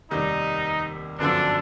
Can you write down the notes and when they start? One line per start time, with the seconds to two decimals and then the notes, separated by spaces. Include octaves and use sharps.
0.11 F1 D#2 D#3 G3 D#4
1.18 G1 F#2 D3 F3 D4